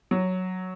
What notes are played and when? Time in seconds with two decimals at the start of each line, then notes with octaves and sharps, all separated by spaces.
0.11 F#3